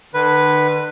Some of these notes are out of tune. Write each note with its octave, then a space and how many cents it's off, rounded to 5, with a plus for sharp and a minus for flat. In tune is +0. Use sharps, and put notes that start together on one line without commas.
D3 +45 B4 +0